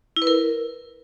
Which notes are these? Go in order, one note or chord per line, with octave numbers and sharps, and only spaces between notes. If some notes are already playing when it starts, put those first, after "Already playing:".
E4
B4
A#4